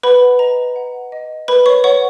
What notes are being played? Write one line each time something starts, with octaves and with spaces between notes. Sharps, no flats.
B4 F#5 B5
D#5 A#5
F#5
D#5
A#4 B4 B5
C#5 C#6
C#5 F#5 C#6